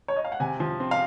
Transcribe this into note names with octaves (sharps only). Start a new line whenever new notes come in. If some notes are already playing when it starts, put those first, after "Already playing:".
C#5
D#5
F5
F#5
C3 G#5
F3
C4
F5